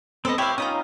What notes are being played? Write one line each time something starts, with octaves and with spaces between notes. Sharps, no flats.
B3 C4 A4 D#5
E4 G4 C#5 E5 F5
C#4 D#4 F4 A#5 B5 D#6